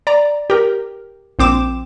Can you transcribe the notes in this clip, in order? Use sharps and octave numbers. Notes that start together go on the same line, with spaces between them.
D5 A#5
G4 A#4
A#1 C4 D6 E7